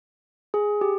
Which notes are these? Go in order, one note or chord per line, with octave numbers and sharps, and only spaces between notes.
G#4
G4